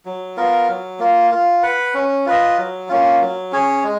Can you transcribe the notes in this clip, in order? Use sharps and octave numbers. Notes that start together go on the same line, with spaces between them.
F#3
B3 F4 A#4
F#3
A#3 F4
F4
B4 F#5
C#4
F4 B4 D#5
F#3
A#3 C#4 F4
F#3
C#4 G#4 C#5
G#3